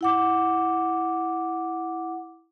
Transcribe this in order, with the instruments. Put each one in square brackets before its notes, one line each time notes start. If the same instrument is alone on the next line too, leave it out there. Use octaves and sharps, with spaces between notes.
[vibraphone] E4 F#5 D6